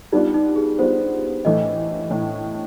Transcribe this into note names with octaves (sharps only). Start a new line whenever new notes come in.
G3 B3 D4 D#4 F4
D#4
G#4
G3 B3 D4 F4 C5
A2 E3 A3 D#5
A2 E3 A3